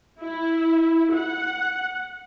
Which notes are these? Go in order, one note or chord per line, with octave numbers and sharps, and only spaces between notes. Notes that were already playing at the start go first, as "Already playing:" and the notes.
E4
F#5